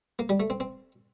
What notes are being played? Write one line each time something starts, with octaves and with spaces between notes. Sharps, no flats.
A#3
G3
A3
C4
C4